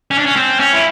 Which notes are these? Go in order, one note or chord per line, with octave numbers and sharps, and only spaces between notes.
C#4
D4
C#4
C4
C#4
E4